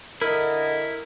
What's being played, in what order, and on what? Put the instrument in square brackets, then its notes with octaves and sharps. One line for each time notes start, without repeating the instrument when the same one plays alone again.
[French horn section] D3 A4 D#5 [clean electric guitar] E4 [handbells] A#4